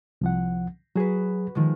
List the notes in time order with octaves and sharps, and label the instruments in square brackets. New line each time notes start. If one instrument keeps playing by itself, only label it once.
[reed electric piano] C2 F3 F#5
[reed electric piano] F#3 G#4 [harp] F#4 B4
[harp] D#3 F3 G#3